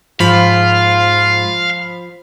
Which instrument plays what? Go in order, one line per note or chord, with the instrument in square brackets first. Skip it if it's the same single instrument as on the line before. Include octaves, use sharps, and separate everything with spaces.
[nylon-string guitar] G#2 [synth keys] F3 B5 [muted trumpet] F4 [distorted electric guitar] F5